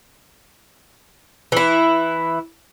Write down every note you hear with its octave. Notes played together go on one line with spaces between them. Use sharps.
E3 E4